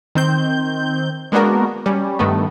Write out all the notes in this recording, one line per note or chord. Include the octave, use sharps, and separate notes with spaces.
D#3 C4 G6
G#3 A#3 B3 D4 F#4 A#4
G3 C#4
G2 D#3 A3 B3